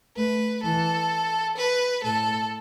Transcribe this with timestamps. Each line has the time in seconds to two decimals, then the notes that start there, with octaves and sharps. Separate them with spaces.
0.17 A3 B4
0.63 E3 A4
1.57 B4
2.04 A2 A4